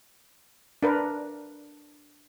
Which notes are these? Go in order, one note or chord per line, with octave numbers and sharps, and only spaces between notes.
D4 A#4 B4